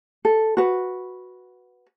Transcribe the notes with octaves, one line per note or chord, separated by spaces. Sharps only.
A4
F#4 B4